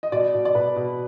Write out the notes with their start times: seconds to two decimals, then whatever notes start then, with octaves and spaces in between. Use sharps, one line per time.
0.03 D#5
0.12 B2 D5
0.34 B2
0.45 D5
0.55 B2 B4
0.76 B2